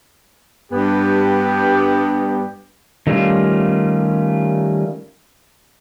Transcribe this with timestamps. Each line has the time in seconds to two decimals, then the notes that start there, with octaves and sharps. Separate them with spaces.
0.72 G2 B3 G4
3.07 D#3 G3 A3 C#4 F4